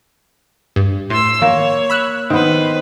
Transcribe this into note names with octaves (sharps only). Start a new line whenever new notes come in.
G2
A2 C6 E6
D#2 A#3 C#5
B5 E6 F#6
D#3 B3 B4 C5